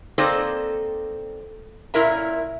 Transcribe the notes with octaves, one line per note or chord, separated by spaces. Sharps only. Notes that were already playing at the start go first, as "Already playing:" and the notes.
A#3 C4 D#4 A4 C5 D5
A#2 C#4 E4 A#4 E5 A#5